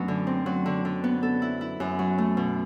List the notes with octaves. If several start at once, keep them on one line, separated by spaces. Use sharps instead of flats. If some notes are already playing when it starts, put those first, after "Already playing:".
Already playing: F#2 F#3 A3 B3 D4
D3
C4
F#3
D3
D3
B3
A4
E4
E4
F#2
F#3
A3
B2